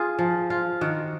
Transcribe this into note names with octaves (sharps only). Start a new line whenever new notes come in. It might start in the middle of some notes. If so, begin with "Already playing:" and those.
Already playing: F4 G#4
F3
F4
D#3 F#4